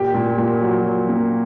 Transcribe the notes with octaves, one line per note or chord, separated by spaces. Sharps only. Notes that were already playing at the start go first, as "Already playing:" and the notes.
Already playing: A#2 G4
A#2
A#2
F#3
F#3
A#3